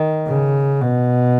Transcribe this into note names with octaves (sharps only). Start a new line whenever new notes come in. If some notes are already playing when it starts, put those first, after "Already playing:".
Already playing: D#3
C#3
B2